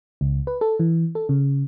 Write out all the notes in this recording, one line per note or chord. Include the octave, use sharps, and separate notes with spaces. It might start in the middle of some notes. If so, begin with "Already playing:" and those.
C#2
B4
A4
E3
A4
C#3